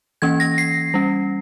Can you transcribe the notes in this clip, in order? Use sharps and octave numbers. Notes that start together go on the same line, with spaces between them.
E3 A#3 C#4 G#6
A#6
C7
G3 C#4